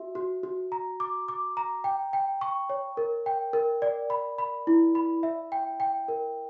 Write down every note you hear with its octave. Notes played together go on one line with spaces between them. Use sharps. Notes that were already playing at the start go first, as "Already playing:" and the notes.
Already playing: F#4 E5
F#4
F#4
A#5
D6
D6
A#5
G5
G5
C#6
C#5
A#4
G5
A#4
D5
B5
B5
E4
B5
E5
G5
G5
A#4